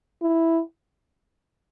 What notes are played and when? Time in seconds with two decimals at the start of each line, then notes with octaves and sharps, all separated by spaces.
0.22 E4